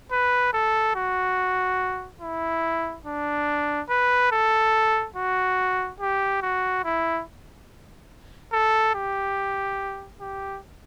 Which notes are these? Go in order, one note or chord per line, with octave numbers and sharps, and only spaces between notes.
B4
A4
F#4
E4
D4
B4
A4
F#4
G4
F#4
E4
A4
G4
G4